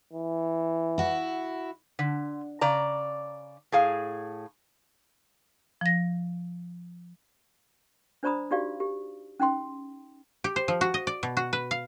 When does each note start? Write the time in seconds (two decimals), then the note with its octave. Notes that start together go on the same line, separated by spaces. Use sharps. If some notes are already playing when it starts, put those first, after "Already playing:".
0.13 E3
0.98 E4 F#4
1.99 D3
2.61 C#3 D5 A#5
3.72 A2 G#4 F5
5.81 F3 A#6
8.23 D4 C5 D5 A#5 B5 D#6
8.51 D#4 F#4 G4 D5 F5
8.80 G4
9.40 C#4 D#4 G5 C6
10.44 G4
10.56 C5
10.68 F3
10.81 F#4
10.94 D#5
11.07 D5
11.23 B2
11.37 F#4
11.53 B4
11.71 F5